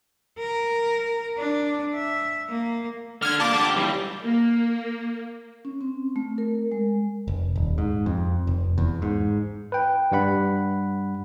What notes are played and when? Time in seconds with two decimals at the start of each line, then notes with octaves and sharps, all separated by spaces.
0.38 A#4
1.37 D4
1.95 E5
2.49 A#3
3.22 D3 F6 G#6
3.40 A#2 A5 D6
3.54 D3 G4
3.76 D#2 E3 G3
4.23 A#3
5.65 C#4
5.81 C4
6.16 A3
6.38 A#4
6.72 G#3
7.28 F1
7.56 D#1
7.78 G#2
8.06 F2
8.47 F1
8.78 E2
9.02 G#2
9.72 B4 G5
10.12 G2 G3 F#5 B5